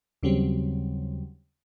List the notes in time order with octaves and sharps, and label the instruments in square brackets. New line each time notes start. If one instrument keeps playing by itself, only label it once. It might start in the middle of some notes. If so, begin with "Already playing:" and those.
[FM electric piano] D#2 C#3 F#3 G3 C4